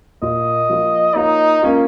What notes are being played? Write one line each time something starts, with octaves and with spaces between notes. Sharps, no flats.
A#2 A#3 F4 A#4 D#5
F3 A#3 F4
A#3 D#4 F4 A#4 C#5
A#3 C#4 F4